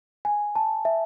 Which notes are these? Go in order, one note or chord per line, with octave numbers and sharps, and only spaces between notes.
G#5
A5
E5